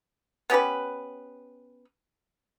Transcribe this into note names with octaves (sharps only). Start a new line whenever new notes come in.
B3 C#4 G4 B4